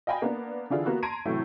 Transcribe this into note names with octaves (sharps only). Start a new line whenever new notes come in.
D#5 F5 G5 G#5 B5
A#3 B3 D4
D3 E3 D4 E4 F4 G#4
A#3 B3 F#4
A5 A#5 C6 G#6 D7 D#7
A2 C3 E3 F#3 A3